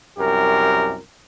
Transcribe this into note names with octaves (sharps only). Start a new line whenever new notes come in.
C2 F#2 G4 A#4